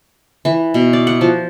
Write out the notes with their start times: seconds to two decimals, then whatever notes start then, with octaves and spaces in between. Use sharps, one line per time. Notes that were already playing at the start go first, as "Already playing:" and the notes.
0.45 E3
0.74 B2
0.93 D5
1.07 F#5
1.21 F3